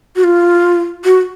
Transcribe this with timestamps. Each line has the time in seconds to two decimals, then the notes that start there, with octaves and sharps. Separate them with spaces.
0.16 F#4
0.24 F4
1.05 F#4